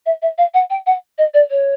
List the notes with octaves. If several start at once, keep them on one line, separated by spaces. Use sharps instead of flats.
E5
E5
F5
F#5
G5
F#5
D#5
D5
C#5